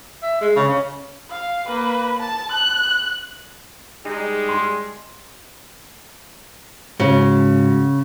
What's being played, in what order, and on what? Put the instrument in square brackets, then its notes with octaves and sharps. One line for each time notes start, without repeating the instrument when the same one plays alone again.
[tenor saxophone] E5
G#3
C#3
C#4
[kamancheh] F5
A#3 B4
A5
F#6
[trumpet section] G3 G#3 [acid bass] D#4 [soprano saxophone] G#4
[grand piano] C6
[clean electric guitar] G#2 F#4 F#5 [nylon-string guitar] C#3